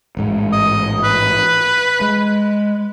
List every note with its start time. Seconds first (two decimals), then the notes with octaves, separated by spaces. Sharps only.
0.17 A1 G#2 G#3
0.53 D#5
1.04 B4
2.01 G#3